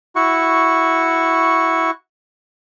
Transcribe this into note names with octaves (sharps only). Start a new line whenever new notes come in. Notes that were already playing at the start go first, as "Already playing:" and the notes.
E4 F#4 C#6